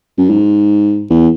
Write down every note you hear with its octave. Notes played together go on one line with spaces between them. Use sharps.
F#2
G#2
E2